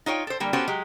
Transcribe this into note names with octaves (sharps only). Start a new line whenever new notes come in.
D#4 F4 C#5 G5
A4 C5
D3 G3 A#3
B3 C#4 F#4 G4 A4 C5
F#3 G#3 G4